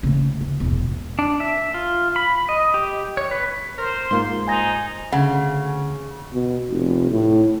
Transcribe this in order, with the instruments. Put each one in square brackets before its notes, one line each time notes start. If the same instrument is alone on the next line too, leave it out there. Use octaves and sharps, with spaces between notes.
[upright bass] C#3 A3
D2
E1 A#1
[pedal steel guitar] D4
E5
F4
B5
D#5
G4
C#5
B4
[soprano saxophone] A#4 [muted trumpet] C5
[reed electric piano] G#2 A#3 F4 [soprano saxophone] C6
[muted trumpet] D#4 [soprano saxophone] C5 [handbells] G#5 G#6 A#6
[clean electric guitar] D2 [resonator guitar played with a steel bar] C#3 [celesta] F#5
[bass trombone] B2
F1
A2